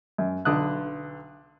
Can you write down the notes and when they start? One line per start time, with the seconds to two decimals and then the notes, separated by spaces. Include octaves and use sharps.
0.18 F#2
0.45 B1 D3 D#6 F#6